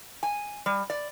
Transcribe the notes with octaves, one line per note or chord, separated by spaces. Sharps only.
G#5
G3
D5